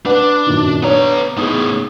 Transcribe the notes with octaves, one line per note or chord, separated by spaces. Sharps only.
D4 B4 F#5
F#2 A#2 D#3
B3 D4 C#5 A#5
A2 B3 D#4 G#4